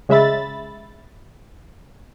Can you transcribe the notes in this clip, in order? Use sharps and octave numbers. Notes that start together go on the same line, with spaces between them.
C#3 G#3 E5 B5 A6